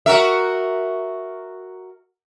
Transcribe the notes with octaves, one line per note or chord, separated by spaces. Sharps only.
F#4 A#4 E5